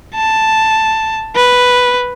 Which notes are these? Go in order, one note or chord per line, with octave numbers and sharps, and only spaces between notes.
A5
B4